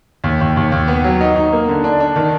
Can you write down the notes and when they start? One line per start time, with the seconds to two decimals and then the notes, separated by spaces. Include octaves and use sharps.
0.24 D#2
0.41 D#2
0.57 D#2
0.72 D#2
0.88 B3
1.04 F#3
1.21 D#4
1.36 D#4
1.52 A#3
1.69 D3
1.84 D4
2.00 D4
2.16 D#3